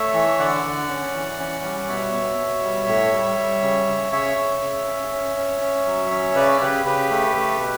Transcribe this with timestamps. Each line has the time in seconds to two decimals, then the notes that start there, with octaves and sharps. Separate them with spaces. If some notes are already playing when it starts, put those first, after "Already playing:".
Already playing: A3 C#5 E5
0.14 E3
0.39 D3 D5 F#5
0.64 D3
0.89 C#4
1.14 E3
1.39 C#4
1.64 G3
1.88 B2 C#5 E5
2.14 B2
2.38 B2
2.63 G3
2.88 A2
3.13 G3
3.37 G3
3.62 C#3
3.88 C#3
4.12 C#3 C#5 E5
4.37 C#3
4.61 C#3
4.87 C#4
5.12 C#4
5.37 C#4
5.61 C#4
5.86 F#3
6.11 C#4
6.35 C#3 B4 D5
6.61 C#3 G4 B4
6.85 C#3 G4 B4
7.11 A3
7.35 A3
7.61 B2